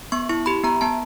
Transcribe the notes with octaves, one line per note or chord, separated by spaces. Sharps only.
B3 C#6
E4 C#6
G4 B5
B3 A#5
B3 A5